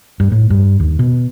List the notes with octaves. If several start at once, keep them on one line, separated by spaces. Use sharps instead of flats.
G2
A2
G2
D#2
B2